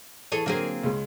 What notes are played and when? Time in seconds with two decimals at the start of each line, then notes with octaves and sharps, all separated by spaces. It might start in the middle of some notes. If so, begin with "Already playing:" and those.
0.32 E3 G#4 A4 C#5
0.46 D3 F#3 A#3 C4 G#4
0.84 C#2 G#3